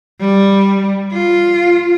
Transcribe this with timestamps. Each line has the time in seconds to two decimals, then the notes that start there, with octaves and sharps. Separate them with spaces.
0.21 G3
1.13 F4